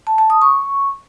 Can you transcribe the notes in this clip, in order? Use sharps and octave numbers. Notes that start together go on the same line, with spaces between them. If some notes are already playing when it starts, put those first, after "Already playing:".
A5
A5
D#6
C#6